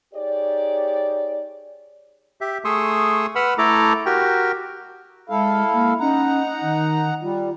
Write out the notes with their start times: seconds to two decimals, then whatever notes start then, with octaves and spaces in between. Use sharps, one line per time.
0.14 D#4 G4 G#4 C#5 D5
2.41 G4 E5
2.65 A3 G#4 C6 C#6 D#6 E6
3.36 B4 F#5 B5 E6 F6
3.58 A3 E4 A4 A#5 D6
4.06 F#4 G4 A#4 G5
5.30 G#3 E4 A4 F5
5.73 A#3
6.00 C#4 D#4 F#5 A#5
6.62 D#3
7.22 G3 F4